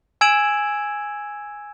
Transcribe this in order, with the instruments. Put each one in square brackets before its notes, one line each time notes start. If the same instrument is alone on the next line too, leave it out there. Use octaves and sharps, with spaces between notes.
[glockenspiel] G#5 E6 G#6 D7 E7 F#7